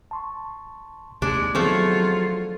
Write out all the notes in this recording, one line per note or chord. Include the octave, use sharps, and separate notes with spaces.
A5 C6 C#6
D#2 C3 G#3 D4
D#3 F3 F#3 A3 B3 C4 F4 G#4